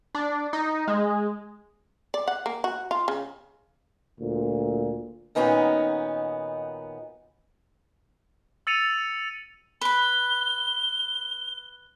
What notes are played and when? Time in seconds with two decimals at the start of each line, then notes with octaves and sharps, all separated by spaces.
0.15 D4
0.53 D#4
0.88 G#3
2.14 D5
2.28 F#5
2.46 A#3
2.64 F#4
2.91 F4
3.08 C#3
4.20 D2 A#2
5.35 A#2 D#3 B3 C#4 D#4 F#4
8.67 E6 A6 C#7 D#7 F7
9.81 B4 B5 G7